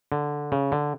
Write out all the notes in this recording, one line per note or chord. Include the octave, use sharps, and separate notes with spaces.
D3
C#3
D3